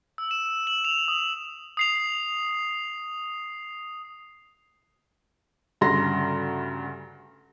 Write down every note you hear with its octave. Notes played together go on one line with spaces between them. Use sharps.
E6
E7
F#7
F7
D#6
D#6 C7 F7
D2 G2 C#3 A#5 C6 A#6